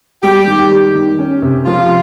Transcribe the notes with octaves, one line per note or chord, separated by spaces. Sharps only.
G3 G4
D#3
D#3
D#3
C#4
C3
F3 F4